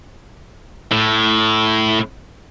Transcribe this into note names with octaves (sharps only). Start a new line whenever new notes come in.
A2